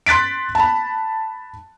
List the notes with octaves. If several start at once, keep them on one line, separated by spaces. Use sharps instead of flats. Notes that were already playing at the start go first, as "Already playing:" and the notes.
C6 F#6 A6 B6 D7
A5 B5